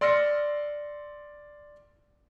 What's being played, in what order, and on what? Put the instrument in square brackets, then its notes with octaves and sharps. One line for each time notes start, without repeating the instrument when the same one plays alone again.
[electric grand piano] D5 C6 E6 F6 A#6 C#7